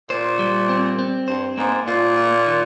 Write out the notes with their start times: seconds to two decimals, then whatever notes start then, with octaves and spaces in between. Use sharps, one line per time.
0.10 A#2 C5
0.39 G3
0.69 C4
0.99 C4
1.28 G2 C5
1.57 G#2 A#3
1.87 A#2 F4
2.17 F4
2.46 D#3